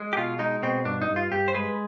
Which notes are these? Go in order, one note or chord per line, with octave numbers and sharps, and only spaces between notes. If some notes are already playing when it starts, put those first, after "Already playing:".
Already playing: G#3
G4
B2 F4
G#3 D#4
B2 C4
G2 D4
D#4
G2
F4
G2 G4
C5
G#3 B4